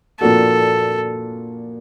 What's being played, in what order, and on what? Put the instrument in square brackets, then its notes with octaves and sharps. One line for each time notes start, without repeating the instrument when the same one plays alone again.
[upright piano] A#2 F3 A#3 D4 F#4 [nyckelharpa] A4